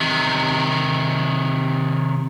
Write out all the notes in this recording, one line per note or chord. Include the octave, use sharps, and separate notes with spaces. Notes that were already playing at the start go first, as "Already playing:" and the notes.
C3 D#3